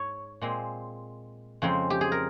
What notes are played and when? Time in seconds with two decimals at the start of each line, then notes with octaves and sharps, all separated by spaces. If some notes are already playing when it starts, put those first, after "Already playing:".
Already playing: G#2 C#5
0.41 A#2 G#3 C4
1.62 F2 C#3 F3 G#3 C4
1.90 G4
2.01 G#4
2.12 A#4